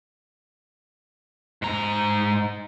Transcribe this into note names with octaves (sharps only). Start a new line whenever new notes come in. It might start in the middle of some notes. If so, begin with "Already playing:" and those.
G#2 A#5